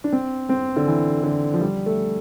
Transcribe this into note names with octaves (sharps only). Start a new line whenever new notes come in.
D4
C4
C4
D3
E3
D3
F3
G3
A3